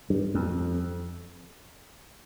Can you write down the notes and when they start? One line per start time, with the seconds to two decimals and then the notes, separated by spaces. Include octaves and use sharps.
0.10 G2
0.34 F2